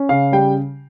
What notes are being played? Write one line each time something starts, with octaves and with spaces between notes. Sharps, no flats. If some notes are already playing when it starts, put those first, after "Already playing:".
Already playing: C#4
C#3 F5
G3 G5